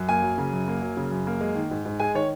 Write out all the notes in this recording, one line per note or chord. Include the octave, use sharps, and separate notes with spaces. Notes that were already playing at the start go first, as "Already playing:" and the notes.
Already playing: F#2
A#3 G#5
F#3
C#3
F#2
A#3
F#3
C#3
F#2
A#3
G#3
D#3
G#2
G#2
G#3 G#5
D#3 C#5